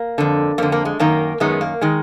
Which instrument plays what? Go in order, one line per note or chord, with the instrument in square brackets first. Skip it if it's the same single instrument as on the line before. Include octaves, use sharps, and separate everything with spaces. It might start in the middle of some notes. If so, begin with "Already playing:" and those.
Already playing: [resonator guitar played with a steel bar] A#3
F2 D3
F2 D3 A#3
A#3
G#3
F#2 D#3 A#3
F#2 D#3 G#3 B3
A#3
D#3 G#3